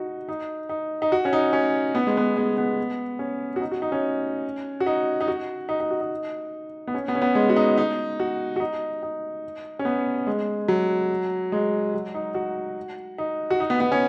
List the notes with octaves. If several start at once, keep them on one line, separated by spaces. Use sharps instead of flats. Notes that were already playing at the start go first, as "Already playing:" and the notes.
Already playing: D#4 F#4
D#4
D#4
D#4
F#4
C#4
D#4
C#4
B3
G#3
B3
G#3
B3
C#4
F#4
D#4
F#4
D#4
C#4
F#4
D#4
D#4
F#4
D#4
D#4
F#4
D#4
B3
C#4
B3
C#4
B3
G#3
F#4
D#4
D#4
F#4
F#4
D#4
D#4
C#4
B3
G#3
F#3
G#3
F#3
D#4
F#4
D#4
F#4
D#4
B3
B3
C#4